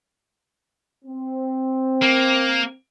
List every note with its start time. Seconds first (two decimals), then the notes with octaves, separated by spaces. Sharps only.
1.05 C4
2.02 A#3